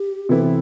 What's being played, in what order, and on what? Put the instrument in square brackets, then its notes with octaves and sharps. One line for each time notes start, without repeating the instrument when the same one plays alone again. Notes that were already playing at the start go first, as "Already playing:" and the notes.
Already playing: [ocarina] G4
[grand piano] C3 E3 B3 E4 [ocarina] A4